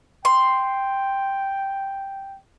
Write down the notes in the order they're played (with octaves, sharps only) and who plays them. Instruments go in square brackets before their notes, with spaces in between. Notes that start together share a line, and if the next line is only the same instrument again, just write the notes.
[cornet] G5 [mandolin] C6